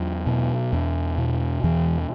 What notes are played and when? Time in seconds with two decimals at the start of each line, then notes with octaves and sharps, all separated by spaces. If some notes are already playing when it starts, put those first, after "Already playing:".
Already playing: E2 F#3
0.27 B2
0.73 E2
1.18 B2
1.64 E2 E3